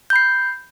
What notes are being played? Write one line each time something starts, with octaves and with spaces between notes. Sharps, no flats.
B5 G6 C7